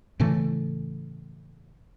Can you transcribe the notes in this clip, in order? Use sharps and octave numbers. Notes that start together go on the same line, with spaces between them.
A2 C#3 E3 A3